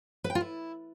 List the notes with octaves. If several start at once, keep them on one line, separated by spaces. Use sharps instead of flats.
B4
G5
F4
E4